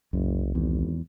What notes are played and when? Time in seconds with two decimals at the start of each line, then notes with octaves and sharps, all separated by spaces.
0.13 F#1 C2 F#2
0.55 G#1 E2